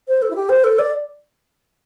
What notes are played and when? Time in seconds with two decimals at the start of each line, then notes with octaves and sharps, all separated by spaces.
0.08 C5
0.22 A4
0.31 E4
0.36 G4
0.49 C5
0.64 A4
0.79 D5